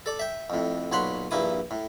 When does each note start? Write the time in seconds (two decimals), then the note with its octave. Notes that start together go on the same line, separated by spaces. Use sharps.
0.06 A4 D5
0.19 E5 G5
0.50 F2 A2
0.92 B1 A#2 C#5 F#5 B5 C6
1.31 A#1 G2 A#3 E4 D#6
1.71 A2